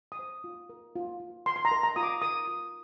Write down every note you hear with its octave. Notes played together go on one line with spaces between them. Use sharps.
D#6
C5
F4
A#4
F4
F4
A#4 C6
C6
A#5
A#4
A#5
F4 D#6
D6
A#4 D#6
F4